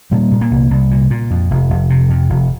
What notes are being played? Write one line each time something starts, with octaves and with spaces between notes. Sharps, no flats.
A#2 G3
A#2
A#3
C2
C2
A#2
A#2
F2
F1
F1
C3
F2
F1